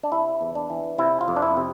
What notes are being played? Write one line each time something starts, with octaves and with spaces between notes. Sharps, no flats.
D4
C3 E4
E2
D4
E3
C3 E4
F4
F2
D4
E4
C3